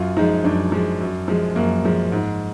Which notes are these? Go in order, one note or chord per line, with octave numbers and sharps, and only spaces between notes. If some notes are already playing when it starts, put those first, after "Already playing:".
Already playing: F#2 F4
F3 G#3 D#4
F#2 D4
F3 G#3
F#2
F3 G#3
F#2 A#3
F3 G#3
G#2